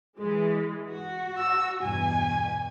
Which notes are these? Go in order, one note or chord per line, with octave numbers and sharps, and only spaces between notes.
E3 G#3
F#4
E6
E2 G2 B2 G#5